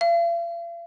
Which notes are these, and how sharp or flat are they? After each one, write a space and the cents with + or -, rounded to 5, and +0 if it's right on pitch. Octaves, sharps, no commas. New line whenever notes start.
F5 -45